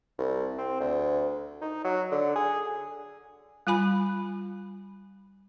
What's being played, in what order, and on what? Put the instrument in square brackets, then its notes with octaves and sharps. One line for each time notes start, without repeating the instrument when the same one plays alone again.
[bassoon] C2
C4
D2
D#4
F#3
D3
G#4
[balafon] G3 F4 G#5 B5